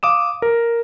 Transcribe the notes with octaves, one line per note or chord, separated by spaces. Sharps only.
F5 D6 D#6 E7
A#4